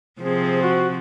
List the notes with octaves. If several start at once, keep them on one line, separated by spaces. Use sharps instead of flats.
C3 F3 C4 G#4
F#4